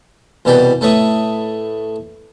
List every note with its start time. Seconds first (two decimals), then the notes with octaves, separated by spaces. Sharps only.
0.45 C2 B2 E3 G4 D5 G5
0.81 A2 A3 B4 C#5 E5 D#6